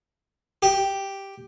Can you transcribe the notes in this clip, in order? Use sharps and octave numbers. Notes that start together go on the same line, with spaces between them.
G4